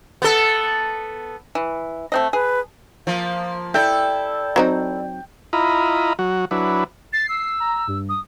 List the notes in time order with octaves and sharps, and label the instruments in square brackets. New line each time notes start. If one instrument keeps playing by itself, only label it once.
[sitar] B3 A4
[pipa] E3
A3 C4 D#5
[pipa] G#4 [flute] B4
[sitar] F3 A#3 [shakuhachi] F5
[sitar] E4 A4 E5 [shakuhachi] D5 [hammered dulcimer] G5
[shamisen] F#3 C4 D#4
[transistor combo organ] E4 F4 D#5 A#5 B5
F#3 F#4
F#3 D4 E4 B4
[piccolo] A6 [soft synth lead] C7
[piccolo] E6
[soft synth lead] A#5
G2
[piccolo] D#6